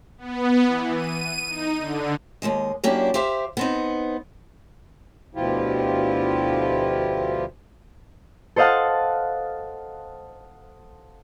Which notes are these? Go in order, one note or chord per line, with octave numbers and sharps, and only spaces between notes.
B3
E3
D#7
D#4
D3
D#2 F3 G#3 D#5
F#3 A#3 C#4 D4 E4 G4
G4 C5 E5 F5
B3 C4 D#4
D2 B2 F3 E4 F4 G4
A4 C5 D#5 F5 F#5 A5